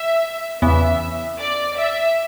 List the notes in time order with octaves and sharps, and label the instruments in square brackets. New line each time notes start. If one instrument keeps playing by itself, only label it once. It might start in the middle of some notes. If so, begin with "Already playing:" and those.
Already playing: [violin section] E5
[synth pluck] E2 C#3 E3 B3 [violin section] E5
[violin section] D5
E5